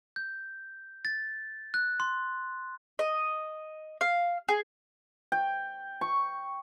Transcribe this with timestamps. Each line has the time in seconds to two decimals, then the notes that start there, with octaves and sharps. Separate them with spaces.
0.16 G6
1.05 A6
1.74 F#6
2.00 C6
2.99 D#5
4.01 F5
4.49 G#4
5.32 G5
6.01 C#6